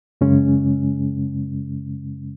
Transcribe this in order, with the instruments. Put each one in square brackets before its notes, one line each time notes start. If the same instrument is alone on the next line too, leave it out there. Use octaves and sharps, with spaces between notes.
[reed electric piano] F#2 C#3 G#3 C#4